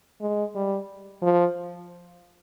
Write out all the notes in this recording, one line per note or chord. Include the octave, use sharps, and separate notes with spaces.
G#3
G3
F3